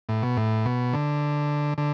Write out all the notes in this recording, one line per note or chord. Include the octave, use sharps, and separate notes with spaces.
A2
B2
A2
B2
D3
D3